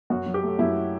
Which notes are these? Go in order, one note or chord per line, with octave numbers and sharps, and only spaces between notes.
F#2 F#4
F#3
G4
A3
F#2 E4